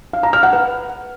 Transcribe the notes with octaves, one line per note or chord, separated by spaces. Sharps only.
F5
A#5
F6
F#5
B4